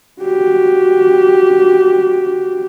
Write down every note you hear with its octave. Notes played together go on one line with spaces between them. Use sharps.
F#4 G4